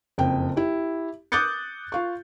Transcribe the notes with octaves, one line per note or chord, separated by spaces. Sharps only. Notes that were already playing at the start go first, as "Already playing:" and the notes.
F#1 F2 G5
E4 G4
D6 D#6 F#6 G6 A6 C#7
F4 F5 C#6